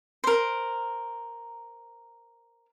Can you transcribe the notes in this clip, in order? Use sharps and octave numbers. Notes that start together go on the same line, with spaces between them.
A#4 C5